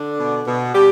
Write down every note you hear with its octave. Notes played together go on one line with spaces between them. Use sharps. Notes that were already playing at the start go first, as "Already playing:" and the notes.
Already playing: D3 D4
B2
B2
B2 G3 G4